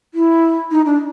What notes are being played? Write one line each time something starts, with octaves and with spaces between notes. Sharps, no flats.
E4
D#4
D4